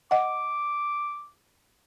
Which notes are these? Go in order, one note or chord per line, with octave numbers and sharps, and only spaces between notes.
D#5 F#5 D6